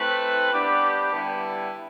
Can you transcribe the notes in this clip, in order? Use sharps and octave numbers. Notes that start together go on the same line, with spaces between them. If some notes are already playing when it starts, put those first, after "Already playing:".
Already playing: A3 C4 E4 B4
G3 B3 D4 G4
D3 G3 B3 E4